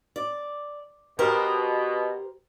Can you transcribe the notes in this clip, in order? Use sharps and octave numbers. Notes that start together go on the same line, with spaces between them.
D5
B2 G4 A#4 C5